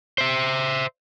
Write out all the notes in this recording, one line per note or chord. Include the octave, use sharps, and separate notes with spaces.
C5 E5